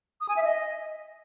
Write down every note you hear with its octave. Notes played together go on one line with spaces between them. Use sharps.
D#6
G#5
E5
D#5